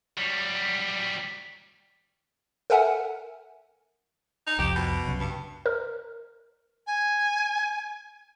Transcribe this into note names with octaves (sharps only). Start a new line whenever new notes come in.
F#3 G3
A4 A#4 E5 F#5 G#5
D#4
C2 F2 G4
B2
C2 F#2 C#3
G2
A#4
G#5